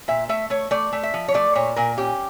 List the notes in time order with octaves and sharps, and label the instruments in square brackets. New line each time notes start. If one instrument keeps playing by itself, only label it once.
[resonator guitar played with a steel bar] A#2 E5
A3 E5
A3 C#5
A3 D5
A3
E5
F3
C#5
A3 D5
A#2 C#5
A#2 A#4
C#4 G4